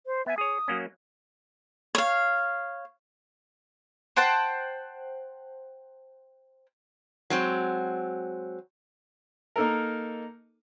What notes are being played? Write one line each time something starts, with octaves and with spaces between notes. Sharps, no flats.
C5
B3 E5 G#5
G#4 C#5 D#6
F#3 A#3 C#4
C#5 F5
C5 F#5 G5 A5
F#3 G#3 C4
A#3 D#4 A4 A#4